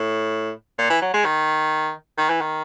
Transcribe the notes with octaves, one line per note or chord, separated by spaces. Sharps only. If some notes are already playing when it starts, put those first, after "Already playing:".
Already playing: A2
A#2
E3
F#3
G#3
D#3
D#3
E3
D#3